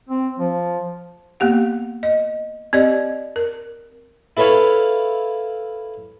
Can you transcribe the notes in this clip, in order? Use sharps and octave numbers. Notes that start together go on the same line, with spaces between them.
C4
F3
A#3 B3 G4 F#5
D#5
C4 G4 D5 D#5
A#4
E4 A4 B4 C#5 F5